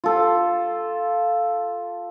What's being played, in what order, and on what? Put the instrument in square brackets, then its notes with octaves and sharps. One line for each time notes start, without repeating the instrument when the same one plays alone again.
[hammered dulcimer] F4 A4